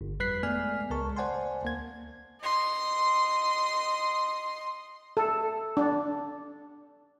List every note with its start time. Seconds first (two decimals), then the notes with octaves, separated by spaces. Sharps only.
0.01 G1
0.19 F2 G3 B4 F#6 B6 C7
0.43 G#3 A3 B3 D5 G#5 F6
0.90 C#2 G#3 A#4 A5 C#6
1.17 C5 D5 F#5 G#5 A5 C6
1.63 D2 A#3 G#6
2.42 D#5 C6
5.17 A4
5.77 D4